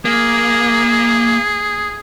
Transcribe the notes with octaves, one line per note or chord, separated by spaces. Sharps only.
A#3 G#4